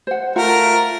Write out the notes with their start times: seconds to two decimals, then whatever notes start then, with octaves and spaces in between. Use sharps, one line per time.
0.07 C5 F#5
0.36 A3 F4 A#4 F#5